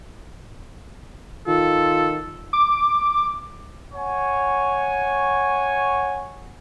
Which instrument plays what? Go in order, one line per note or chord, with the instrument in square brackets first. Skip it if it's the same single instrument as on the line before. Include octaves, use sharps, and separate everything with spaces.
[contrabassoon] D#3 [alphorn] F4 [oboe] A4
[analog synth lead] D6
[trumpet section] C#5 F#5 G#5 C#6